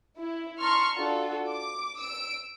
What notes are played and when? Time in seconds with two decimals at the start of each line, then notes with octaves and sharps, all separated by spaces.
0.18 E4
0.59 A5 A#5 C6 C#6 F6
0.96 D4 F4 F#4 A4
1.49 D6
2.00 E6 D7